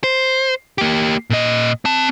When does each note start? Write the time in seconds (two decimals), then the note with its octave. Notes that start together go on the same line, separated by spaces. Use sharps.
0.04 C5
0.78 A#3 G4
1.30 A#2 D#5
1.85 C4 A5